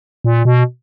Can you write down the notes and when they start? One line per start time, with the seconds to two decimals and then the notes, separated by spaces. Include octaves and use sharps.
0.24 A#2
0.45 B2